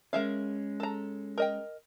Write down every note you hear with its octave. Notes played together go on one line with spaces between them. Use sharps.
G#3 C#4 A#4 E5 F5
A4 A#5
A#4 D#5 G5